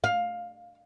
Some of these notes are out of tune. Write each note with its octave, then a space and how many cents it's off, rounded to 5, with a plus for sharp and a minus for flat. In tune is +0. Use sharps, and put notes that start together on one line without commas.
F5 +15